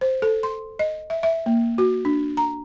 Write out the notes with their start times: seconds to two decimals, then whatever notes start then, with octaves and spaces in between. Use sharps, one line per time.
0.01 C5
0.22 A4
0.43 C6
0.79 D#5
1.10 E5
1.23 E5
1.46 A#3
1.78 F#4
2.05 D4
2.37 A#5